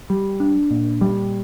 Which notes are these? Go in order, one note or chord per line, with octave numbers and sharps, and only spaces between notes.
G3
D4
A#2
G3